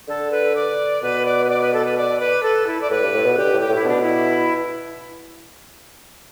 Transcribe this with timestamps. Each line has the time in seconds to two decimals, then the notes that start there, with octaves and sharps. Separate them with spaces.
0.08 D3 A4
0.31 B4
0.55 D5
1.02 B2 B4
1.25 D5
1.44 B4
1.50 D5
1.61 B4
1.73 A4
1.85 B4
1.97 D5
2.20 B4
2.43 A4
2.67 E4
2.81 D5
2.90 A2 B4
3.03 G2
3.14 A2
3.25 B2
3.37 D3 G4
3.53 A2
3.60 G4
3.69 A2
3.75 E4
3.84 B2 D4
4.02 E4